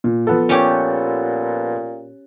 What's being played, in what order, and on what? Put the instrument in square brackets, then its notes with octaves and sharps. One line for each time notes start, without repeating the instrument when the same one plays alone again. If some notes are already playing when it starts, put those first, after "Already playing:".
[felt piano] A#2
F3 B3 A4
[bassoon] A#2 [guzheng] C#4 G4 C#5